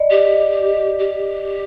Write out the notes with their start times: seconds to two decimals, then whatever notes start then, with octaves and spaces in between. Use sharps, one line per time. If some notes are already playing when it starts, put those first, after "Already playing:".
Already playing: D5 D#5
0.10 G4
0.99 G4